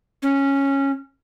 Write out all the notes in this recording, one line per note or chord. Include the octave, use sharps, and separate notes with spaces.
C#4